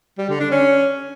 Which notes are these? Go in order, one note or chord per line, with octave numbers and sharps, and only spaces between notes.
G3
D3
D4
C#4